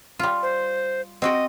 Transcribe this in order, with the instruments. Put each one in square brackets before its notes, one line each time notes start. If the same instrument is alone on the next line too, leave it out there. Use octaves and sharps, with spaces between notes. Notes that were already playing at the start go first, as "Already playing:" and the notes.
[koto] G3 F4
[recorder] C5
[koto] C4 F#4 G5 [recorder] D#5